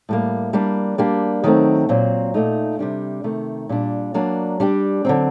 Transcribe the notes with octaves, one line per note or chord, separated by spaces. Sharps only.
A2 G3 A#3
G3 A#3 D4
G3 A#3 D4 G4
D#3 F#3 A3 C4
A#2 F#3 C4
A#2 A3 D#4
C3 G3 D4
C3 D#3 A3
A#2 G3 D4
F#3 A#3 D4
G3 D4 G4
D3 F#3 C4